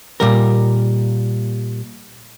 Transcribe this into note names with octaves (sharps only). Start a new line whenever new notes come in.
A#2 G3 A#4